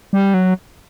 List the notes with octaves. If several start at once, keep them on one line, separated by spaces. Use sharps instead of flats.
G3
F#3